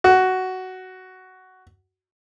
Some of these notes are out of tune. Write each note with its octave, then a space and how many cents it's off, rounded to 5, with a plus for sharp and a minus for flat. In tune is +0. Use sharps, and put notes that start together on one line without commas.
F#4 +10